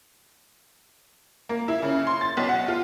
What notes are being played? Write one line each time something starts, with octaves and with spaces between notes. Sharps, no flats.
A#3
E4
C#3
C6
A6
B1
F#5
F4